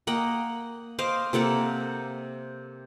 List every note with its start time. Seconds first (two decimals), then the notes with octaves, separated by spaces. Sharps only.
0.07 A#3 D#5 F#5 G5
0.99 C5 D#5 F5 D6
1.33 C3 A#3 A4 F#5